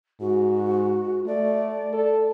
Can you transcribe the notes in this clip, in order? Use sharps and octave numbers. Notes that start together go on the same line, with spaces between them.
G#2 F#4
A3 D5
A4